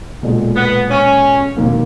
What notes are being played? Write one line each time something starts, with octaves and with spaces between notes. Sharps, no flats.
B1 A#2 G#3
B3
C#4
E1 D#2 D#3 A#3